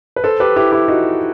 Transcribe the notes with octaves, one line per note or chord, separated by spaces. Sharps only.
B4
A4 C5
G4 B4
E4 G4
E4 G4
D#4 F#4